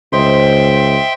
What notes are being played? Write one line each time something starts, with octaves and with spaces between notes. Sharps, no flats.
C#2 C5 D#5 E5 G5 C6